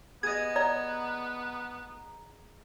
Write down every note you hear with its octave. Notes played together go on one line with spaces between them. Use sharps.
B3 G#4 D#5 G#6
D5 A#5